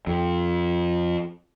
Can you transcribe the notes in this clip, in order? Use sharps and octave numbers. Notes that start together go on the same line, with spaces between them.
F2